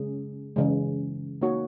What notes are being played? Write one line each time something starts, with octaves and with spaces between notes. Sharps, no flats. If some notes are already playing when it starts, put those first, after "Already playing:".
Already playing: C#3 G#3 C#4 G#4
C#3 E3 G#3
A#3 D#4 F#4 C#5